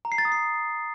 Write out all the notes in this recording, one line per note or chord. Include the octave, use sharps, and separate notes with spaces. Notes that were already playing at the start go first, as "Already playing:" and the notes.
A#5
C7
A6
D#6
C7